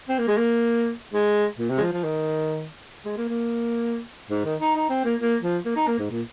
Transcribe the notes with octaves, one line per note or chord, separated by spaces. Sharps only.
C4
A#3
G#3
A#3
G#3
A#2
C3
G#3
F3
F3
D#3
G#3
A#3
A#3
G#2
D#3
D#4
D#4
C4
A#3
A#3
F3
A#3
D#4
A#3
G#2
A#2